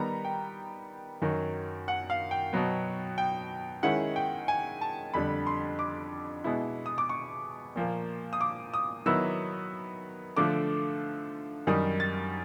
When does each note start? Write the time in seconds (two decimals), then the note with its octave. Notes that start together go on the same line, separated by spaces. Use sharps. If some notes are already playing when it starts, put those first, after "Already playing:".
Already playing: D#3 G3 B3 A#5
0.25 G5
1.22 F#2 D#3 F#3
1.88 F#5
2.10 F5
2.31 G5
2.53 B2 F#3 B3
3.18 G5
3.83 D#3 G#3 C#4 E4 F#5
4.16 G5
4.48 G#5
4.81 A5
5.14 F2 D3 G3 B5
5.47 C6
5.79 D6
6.44 B2 G#3 B3 E4
6.86 D#6
6.98 D6
7.09 C#6
7.76 A#2 F3 A#3
8.33 D#6
8.41 D6
8.74 D#6
9.06 D#3 F#3 B3 E4 E6
10.36 D3 F3 A3 D6
11.67 F#2 D#3 G3 D#6
12.00 A6